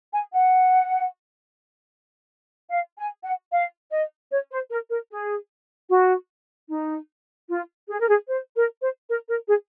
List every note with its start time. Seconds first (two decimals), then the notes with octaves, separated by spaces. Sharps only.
0.13 G#5
0.33 F#5
2.71 F5
2.99 G#5
3.24 F#5
3.52 F5
3.91 D#5
4.31 C#5
4.51 C5
4.70 A#4
4.90 A#4
5.11 G#4
5.89 F#4
6.70 D#4
7.49 F4
7.89 G#4
7.99 A#4
8.08 G#4
8.29 C5
8.55 A#4
8.81 C5
9.08 A#4
9.28 A#4
9.48 G#4